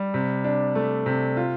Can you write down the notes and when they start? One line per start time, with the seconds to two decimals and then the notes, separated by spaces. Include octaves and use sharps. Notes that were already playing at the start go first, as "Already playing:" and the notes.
Already playing: G3
0.14 C3
0.44 D4
0.75 A3
1.06 C3
1.37 F4